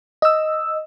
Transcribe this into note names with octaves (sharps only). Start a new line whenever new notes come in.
D#5 E6